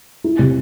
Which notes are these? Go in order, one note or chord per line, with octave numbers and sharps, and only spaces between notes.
E4
C3